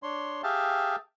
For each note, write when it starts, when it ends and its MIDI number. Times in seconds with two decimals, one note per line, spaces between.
0.03 0.42 62
0.03 0.42 73
0.03 0.42 84
0.43 0.96 67
0.43 0.96 68
0.43 0.96 76
0.43 0.96 77
0.43 0.96 79
0.43 0.96 81